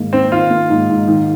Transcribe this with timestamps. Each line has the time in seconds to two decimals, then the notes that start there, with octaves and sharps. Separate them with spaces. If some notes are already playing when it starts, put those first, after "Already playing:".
Already playing: G#2 D#3 A#3
0.13 C4 D#4
0.32 D#3 F4
0.50 A#3
0.70 G#2
0.89 G#2
1.08 D#3